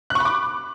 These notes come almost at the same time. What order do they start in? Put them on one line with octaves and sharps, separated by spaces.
F#6 C#6 B5 D6